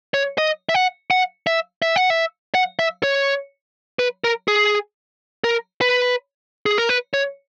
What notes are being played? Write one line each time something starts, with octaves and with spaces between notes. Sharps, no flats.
C#5
D#5
E5
F#5
F#5
E5
E5
F#5
E5
F#5
E5
C#5
B4
A#4
G#4
A#4
B4
G#4
A#4
B4
C#5